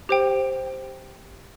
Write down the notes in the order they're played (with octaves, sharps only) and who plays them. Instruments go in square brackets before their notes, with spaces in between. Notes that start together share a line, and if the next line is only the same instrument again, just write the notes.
[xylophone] G4 C5 G5